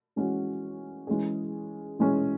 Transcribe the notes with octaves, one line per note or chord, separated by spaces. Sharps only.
E3 G#3 C#4 F#4
E3 G#3 C#4 G#4
E3 G#3 C#4 G#4